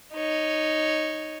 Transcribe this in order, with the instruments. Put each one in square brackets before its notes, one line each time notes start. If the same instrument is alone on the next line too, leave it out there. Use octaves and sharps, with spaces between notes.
[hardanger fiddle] D#4 C#5